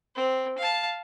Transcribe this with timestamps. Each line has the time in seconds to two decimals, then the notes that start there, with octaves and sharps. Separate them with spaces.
0.16 C4
0.58 F5 A5